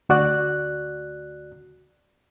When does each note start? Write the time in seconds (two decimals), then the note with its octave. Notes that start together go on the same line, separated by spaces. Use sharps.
0.09 D2 F#4 D5 F#6